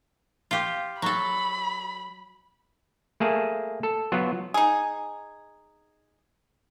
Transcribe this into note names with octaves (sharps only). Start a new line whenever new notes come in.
F4 G4
F#3 A4 B5
A3 A#3 G#4 A5
A4
F#3 B3 F4
D#4 G#4